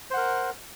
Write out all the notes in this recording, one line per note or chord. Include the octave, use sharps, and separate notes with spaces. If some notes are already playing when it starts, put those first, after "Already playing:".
A#4 C5 F#5